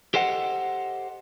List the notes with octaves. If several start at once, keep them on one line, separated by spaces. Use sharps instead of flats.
G4 A4 C5 D#5 F#5